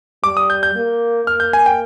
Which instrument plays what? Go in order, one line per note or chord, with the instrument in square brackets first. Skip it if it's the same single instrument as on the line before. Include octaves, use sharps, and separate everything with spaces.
[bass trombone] G3 [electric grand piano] D6
[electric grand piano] D#6
G6
G6
[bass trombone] A#3
[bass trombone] A#3 [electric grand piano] F6
[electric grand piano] G6
G#5
G5